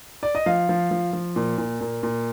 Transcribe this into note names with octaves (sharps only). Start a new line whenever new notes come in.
D5
D#5
F3 F5
F3
F3
F3
A#2
A#2
A#2
A#2